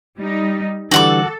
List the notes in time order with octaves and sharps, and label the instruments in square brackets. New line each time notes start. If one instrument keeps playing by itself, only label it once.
[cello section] G3 D#4
[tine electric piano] D3 E3 G3 [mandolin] F#4 F#5 D6 [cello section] A4